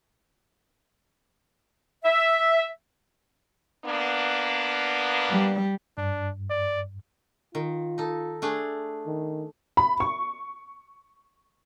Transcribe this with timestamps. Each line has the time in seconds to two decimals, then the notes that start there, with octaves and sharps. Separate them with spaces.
2.04 E5
3.85 A#3 B3 D4
5.29 G3
5.98 G2 D4
6.50 D5
7.55 D#3 F4
7.98 D#4 A4
8.42 A3 D4 G#4
9.07 D#3
9.77 B5
10.00 C#6